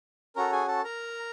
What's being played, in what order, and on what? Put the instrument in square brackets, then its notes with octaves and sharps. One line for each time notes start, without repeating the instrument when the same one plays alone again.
[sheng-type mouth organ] C#4 F#4 A4 A#4 A#5
G#4 G#5
A4 A5
A#4 A#5